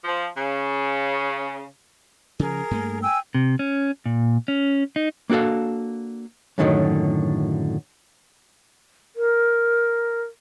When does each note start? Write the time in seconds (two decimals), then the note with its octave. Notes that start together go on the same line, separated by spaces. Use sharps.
0.04 F3
0.36 C#3
2.39 C#3 F3 G#4 A#4
2.71 G2 A3 A#3
3.02 G5 G#5 E6
3.35 C3
3.59 C#4
4.06 A#2
4.48 C#4
4.96 D#4
5.30 A#3 D4 F#4 A4 F5
6.58 F#2 A2 D3 D#3 F3 F#3
9.16 A#4